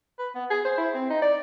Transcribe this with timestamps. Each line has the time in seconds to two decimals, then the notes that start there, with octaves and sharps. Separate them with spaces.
0.19 B4
0.35 B3
0.50 G#4
0.65 C5
0.78 E4
0.94 C4
1.10 D#4
1.22 D5